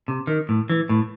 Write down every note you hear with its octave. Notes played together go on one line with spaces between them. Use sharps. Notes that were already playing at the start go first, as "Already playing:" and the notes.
C3
D#3
A2
E3
A2